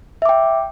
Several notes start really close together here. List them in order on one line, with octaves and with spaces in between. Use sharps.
E5 D6 G5